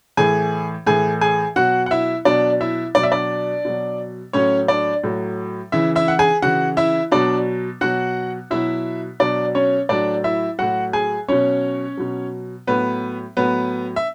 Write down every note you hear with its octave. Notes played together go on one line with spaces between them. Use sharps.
A2 E3 G#4 G#5
A2 E3 G#4 G#5
G#4 G#5
B2 F#3 F#4 F#5
F#5
E4 E5
B2 F#3 D4 D5
E4 E5
B2 F#3 D5
E5
D4 D5
B2 F#3
A2 F#3 C#4 C#5
D4 D5
A2 F#3
C#3 E3 E4 E5
E4 E5
F#5
G#4 G#5
C#3 E3 F#4 F#5
E4 E5
B2 F#3 D4 D5
B2 F#3 F#4 F#5
B2 F#3 E4 E5
B2 F#3 D4 D5
C#4 C#5
A2 F#3 D4 D5
E4 E5
A2 F#3 F#4 F#5
G#4 G#5
B2 F#3 C#4 C#5
B2 F#3
A2 F#3 B3 B4
A2 F#3 B3 B4
E5